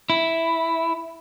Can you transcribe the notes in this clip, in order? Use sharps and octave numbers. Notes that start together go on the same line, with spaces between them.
E4